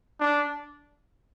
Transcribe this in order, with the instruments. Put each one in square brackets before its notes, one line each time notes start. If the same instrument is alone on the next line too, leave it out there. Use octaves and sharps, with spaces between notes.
[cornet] D4